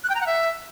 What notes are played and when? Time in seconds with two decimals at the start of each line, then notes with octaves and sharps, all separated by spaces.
0.04 F#6
0.09 G5
0.15 A#5
0.21 F#5
0.26 E5